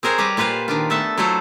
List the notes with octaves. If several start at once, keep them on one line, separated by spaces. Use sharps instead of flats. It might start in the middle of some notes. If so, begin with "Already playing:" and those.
C4 G#4 A#4 C5 C#5
G3 G4 B4 A#5
A#2 F4 B4 C5 F5
D#3 D4 F4
A3 B3 A4 E5 A5
F#3 A3 E4 F4 A4 C5